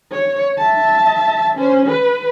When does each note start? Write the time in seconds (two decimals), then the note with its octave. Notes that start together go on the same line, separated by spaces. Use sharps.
0.11 C#5
0.58 E5 A5
1.56 C#4 C5
1.86 B4